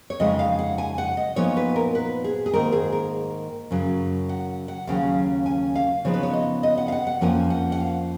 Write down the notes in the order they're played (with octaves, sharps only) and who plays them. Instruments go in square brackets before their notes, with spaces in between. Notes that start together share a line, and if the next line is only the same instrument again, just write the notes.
[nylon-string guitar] C#5
F2 C#3 G#3 D#4 D#5
F5
F#5
G#5
F#5
D#5
A#2 F3 B3 D#4 C#5
B4
A#4
B4
G#4
G#4
G#2 D#3 A#3 D#4 A#4
G#4
A#4
F#2 C#3 F#3
F#5
F#5
D#2 C#3 F#3 C#4 F5
G#5
F5
C#3 F3 B3 D#4 C#5
B4
C#5
D#5
D#5
F#5
F5
F#5
F#5
F2 F3 A#3 C#4 F4 G#5
F#5
F#5
F5